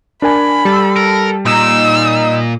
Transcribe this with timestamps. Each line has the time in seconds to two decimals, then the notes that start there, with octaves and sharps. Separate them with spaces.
0.22 D4 A#4 G#5 B5
0.65 G3 A4
0.96 A#4
1.46 A#2 D#4 E6